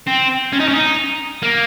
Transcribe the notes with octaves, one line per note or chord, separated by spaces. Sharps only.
C4
C#4
D#4
C#4
D#4
A#3